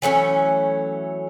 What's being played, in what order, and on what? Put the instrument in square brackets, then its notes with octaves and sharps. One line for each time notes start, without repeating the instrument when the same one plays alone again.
[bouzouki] E3 F#3 A3 C#4